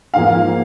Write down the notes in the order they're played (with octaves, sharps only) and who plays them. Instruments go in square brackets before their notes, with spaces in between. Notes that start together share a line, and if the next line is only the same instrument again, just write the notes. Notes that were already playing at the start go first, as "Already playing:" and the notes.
[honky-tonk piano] G#2 F3 A#3 F5